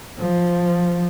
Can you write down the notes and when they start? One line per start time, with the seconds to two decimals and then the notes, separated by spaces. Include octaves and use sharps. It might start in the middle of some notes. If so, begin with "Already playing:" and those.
0.19 F3